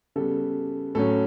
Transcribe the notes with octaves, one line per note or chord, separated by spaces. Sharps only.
C#3 G3 B3 A4
A2 F#3 C#4 A4